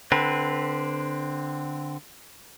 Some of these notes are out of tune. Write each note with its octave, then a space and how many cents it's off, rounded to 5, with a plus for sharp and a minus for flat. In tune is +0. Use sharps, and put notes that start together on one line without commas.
D3 +0 C4 +0 B4 -25